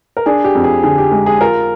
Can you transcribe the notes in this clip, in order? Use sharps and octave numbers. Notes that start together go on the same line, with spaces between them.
A#4
D4 G#4
G4
F2
G#4
D3 G#4
G4
G#3 G#4
G#4
F4 A#4